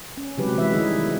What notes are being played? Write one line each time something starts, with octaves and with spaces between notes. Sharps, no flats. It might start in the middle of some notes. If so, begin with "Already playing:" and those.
C#4
C3 F#3 G#3 G4 B4
E3 G#3 B4 E5
D#3 G3 D#4 E4 G#4
B3